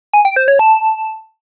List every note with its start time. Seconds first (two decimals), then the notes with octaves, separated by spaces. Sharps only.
0.13 G#5
0.25 G5
0.36 C5
0.48 C#5
0.59 A5